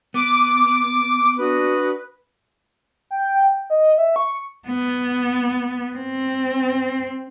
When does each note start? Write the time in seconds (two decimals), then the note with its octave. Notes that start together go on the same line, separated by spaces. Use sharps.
0.14 B3 D6
1.39 D4 F#4 B4 D#6
3.11 G5
3.70 D#5
3.98 E5
4.16 C#6
4.68 B3
5.97 C4